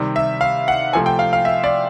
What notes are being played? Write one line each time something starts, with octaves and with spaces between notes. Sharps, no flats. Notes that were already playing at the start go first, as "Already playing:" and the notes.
Already playing: C3 D#3 G3
E5
F5
F#5
C3 F3 A3 G#5
G5
F5
F5
E5
D5